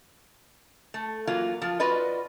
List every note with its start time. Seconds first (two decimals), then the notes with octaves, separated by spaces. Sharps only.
0.94 A3
1.27 E3 F#3 A#3 F4
1.62 F3 F4
1.80 F4 F#4 B4 D5 D#5